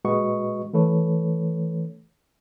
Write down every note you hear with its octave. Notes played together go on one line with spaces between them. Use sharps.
A#2 G#3 F#4 B4 D#5 C#6
E3 A3 A4 B4 C#5